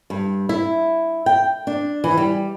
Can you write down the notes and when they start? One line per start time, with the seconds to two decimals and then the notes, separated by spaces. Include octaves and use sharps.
0.10 G2
0.49 E4
1.26 G5
1.67 D4
2.04 E3
2.17 G3